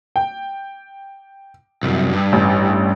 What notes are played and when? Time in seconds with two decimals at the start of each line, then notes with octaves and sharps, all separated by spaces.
0.16 G5
1.83 C2 F#2
2.13 G2
2.32 A1